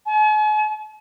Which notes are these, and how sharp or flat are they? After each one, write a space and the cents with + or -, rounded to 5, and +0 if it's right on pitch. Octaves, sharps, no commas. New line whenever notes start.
G#5 +45